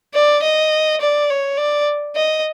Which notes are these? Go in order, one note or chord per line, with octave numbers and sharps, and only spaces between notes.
D5
D#5
D5
C#5
D5
D#5